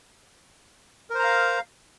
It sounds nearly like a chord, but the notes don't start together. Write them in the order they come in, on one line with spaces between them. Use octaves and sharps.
A#4 C5 A#5 F5